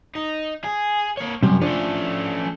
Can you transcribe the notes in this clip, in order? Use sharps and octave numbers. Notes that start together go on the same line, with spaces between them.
D#4
G#4
A#3 C#5
F#2 C3 G3
F3 A3 C#4 D4